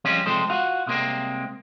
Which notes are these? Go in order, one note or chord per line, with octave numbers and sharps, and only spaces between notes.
F3 G3 G#3 C4 C#4 F4
C2 F3 G#3 C4 A4 C5
F4 F#4 F5 F#5
C2 C3 G#3 A#3 C4